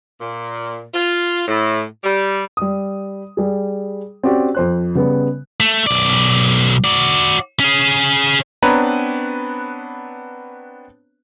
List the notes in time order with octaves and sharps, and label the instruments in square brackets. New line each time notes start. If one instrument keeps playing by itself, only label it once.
[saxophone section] A#2
F4
A2
G3
[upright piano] G3 D#6
G3 G#4
C4 C#4 F#4 G4 D5
F2 C5 F#6
C#3 G3 B3
[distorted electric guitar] A3
B1 D5
F#4 D5
C#4 G#4
[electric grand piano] B3 C4 D4 B4 C#5 A#5